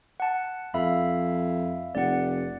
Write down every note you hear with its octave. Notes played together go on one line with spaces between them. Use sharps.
F#5 A5
F2 E5 F5 B5
F1 D5 F#5